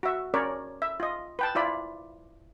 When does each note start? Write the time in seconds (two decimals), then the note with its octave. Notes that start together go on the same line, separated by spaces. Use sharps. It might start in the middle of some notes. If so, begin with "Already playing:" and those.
0.03 F#4 E5
0.34 C#4 A#4 C#5 D5
0.82 E5
1.00 F4 D#5
1.39 B4 G5 A5
1.55 E4 F4 D5 B5